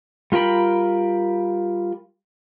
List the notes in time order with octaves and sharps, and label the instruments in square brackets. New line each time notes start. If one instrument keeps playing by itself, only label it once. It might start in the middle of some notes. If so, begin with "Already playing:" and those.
[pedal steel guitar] G3 F4 A#4 G5 B5